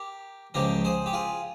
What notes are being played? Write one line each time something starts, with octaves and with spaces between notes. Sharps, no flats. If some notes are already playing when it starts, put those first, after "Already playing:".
Already playing: G4 A#4
C#2 C#3 F3 G4 A#4
G#4 C5
G4
F4 G#4